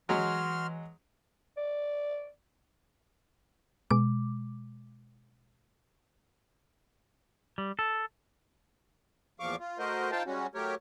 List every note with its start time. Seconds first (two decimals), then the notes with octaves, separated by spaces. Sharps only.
0.09 E3 F#3 G#3 C#4 F#4 C6 F6
1.57 D5
3.90 B2 G#3 D6
7.58 G3
7.79 A4
9.40 E2 A#2 F3 F5 C#6 D6
9.60 F4
9.79 A3 F#4 A#4 C5 D#5
10.11 D#4 F4 C5 F5 G5 A5
10.26 G3 G#3 C#4 F#4
10.55 F#3 A3 G4 A#4 C#5